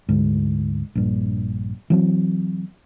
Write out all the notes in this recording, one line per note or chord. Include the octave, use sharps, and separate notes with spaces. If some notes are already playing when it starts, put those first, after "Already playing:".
D2 G#2
A#1 G2
E3 F#3 C4